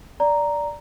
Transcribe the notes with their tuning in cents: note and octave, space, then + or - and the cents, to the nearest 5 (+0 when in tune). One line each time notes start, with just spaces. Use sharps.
D5 -5 A#5 +0